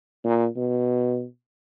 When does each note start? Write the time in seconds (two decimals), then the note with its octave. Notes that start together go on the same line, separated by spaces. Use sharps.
0.24 A#2
0.57 B2